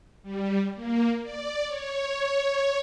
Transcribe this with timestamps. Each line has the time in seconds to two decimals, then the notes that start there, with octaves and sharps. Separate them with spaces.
0.23 G3
0.75 A#3
1.23 D5
1.66 C#5